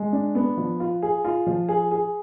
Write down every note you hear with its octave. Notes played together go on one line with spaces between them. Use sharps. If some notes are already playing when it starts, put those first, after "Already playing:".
Already playing: G#3
D4
B3
F3
F4
G#4
F4
F3
G#4
G#4